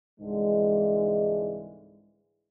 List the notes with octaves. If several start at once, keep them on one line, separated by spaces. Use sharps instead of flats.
C2 G#2 D3 E3 G#3